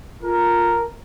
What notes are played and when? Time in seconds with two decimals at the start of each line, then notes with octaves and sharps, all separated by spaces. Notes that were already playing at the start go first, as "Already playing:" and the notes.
0.23 F4 A4 A#4